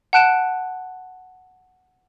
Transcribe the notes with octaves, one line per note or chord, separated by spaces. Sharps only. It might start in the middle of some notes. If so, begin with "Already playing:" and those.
F#5 A5 F#6 D7 E7